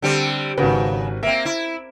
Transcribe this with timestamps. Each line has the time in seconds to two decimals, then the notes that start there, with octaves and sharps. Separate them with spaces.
0.02 D3 G3 C4
0.58 G#1 C#3 F#4 B4
1.23 A#3 C4 E5
1.45 E4